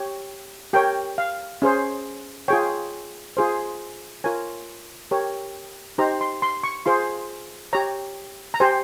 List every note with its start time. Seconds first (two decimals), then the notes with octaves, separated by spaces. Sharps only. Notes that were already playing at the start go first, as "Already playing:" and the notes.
Already playing: G4 C#5
0.73 G4 A#4 C#5 G5
1.18 F5
1.62 C#4 G#4 C5
2.48 F4 G#4 C#5 G5
3.37 F4 G#4 C5
4.24 F4 A#4 C#5 G#5
5.11 G4 A#4 C#5
5.98 D#4 G4 C5 A#5
6.21 C6
6.42 C6
6.63 C#6
6.86 F4 G#4 C5 C6
7.73 G4 C#5 A#5
8.54 A#5
8.60 G4 C5 G#5